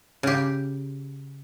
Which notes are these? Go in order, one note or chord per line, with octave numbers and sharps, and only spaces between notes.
C#3 G4